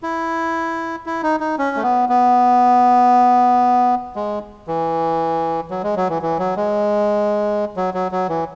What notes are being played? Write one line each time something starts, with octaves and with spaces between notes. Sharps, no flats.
E4
E4
D#4
D#4
C#4
A3
B3
B3
G#3
E3
F#3
G#3
F#3
E3
E3
F#3
G#3
F#3
F#3
F#3
E3